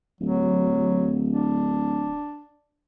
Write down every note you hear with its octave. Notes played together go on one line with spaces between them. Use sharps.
D1 F#3
D4